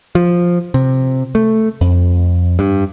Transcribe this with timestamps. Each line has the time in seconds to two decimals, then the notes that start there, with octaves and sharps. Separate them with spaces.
0.15 F3
0.74 C3
1.35 A3
1.81 F2
2.59 G2